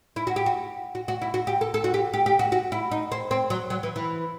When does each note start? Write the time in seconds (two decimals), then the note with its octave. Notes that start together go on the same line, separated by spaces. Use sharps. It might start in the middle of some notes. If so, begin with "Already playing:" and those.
0.16 E4
0.27 F#4
0.36 G4
0.46 F#4
0.95 F#4
1.08 F#4
1.22 E4
1.34 F#4
1.47 G4
1.61 A4
1.74 A4
1.84 F#4
1.94 G4
2.13 G4
2.26 G4
2.39 F#4
2.52 F#4
2.72 E4
2.91 D#4
3.12 C4
3.31 C4
3.50 F#3
3.70 F#3
3.83 E3
3.96 E3